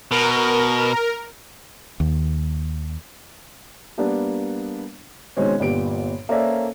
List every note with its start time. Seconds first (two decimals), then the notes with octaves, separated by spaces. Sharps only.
0.11 B2 A#4
2.00 D#2
3.98 G3 A#3 B3 D4
5.37 B2 D#3 G#3 C4 C#4
5.60 G1 A#2 B3 G4 D7
6.29 A#3 C#4 A4 C5 D5 E5